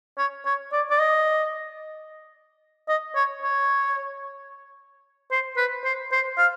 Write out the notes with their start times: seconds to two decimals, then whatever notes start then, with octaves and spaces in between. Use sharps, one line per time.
0.18 C#5
0.46 C#5
0.72 D5
0.91 D5
1.00 D#5
2.88 D#5
3.16 C#5
3.42 C#5
5.31 C5
5.57 B4
5.84 C5
6.12 C5
6.38 F5